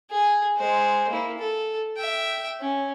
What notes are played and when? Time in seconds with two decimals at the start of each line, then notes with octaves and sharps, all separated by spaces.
0.11 G#4
0.57 G#3 C5
1.09 A#3 E4
1.39 A4
1.97 E5 G5
2.60 C#4